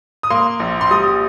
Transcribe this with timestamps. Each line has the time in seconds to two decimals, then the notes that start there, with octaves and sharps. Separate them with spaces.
0.23 D#6
0.30 A#3 C6
0.60 A#1
0.81 C6
0.91 G3 D#6